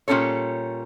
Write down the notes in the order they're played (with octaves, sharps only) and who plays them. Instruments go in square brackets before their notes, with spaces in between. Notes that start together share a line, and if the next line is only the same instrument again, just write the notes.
[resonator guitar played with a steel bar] A#2 G3 C#4 A4 C#5